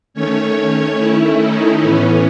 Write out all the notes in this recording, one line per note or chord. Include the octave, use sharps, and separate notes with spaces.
D#3 A3 C#4 C#5
D#3 A3 C#4 E4
D#4
A2 E3 B3 C#4